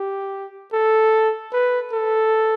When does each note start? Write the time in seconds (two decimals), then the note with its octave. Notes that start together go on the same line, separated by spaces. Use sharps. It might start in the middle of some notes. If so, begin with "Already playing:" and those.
Already playing: G4
0.73 A4
1.53 B4
1.93 A4